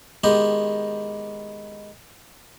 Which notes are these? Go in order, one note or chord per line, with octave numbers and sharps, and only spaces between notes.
D#3 G#3 B3 G4 D#5 C6